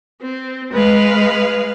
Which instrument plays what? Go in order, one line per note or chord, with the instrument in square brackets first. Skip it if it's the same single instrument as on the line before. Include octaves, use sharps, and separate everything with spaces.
[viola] C4
[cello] G#3 [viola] B4 F5